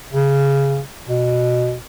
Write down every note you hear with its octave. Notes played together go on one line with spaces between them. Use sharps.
C#3
B2